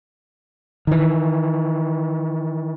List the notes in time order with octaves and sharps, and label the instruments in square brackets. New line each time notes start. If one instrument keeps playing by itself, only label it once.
[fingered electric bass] D#3 E3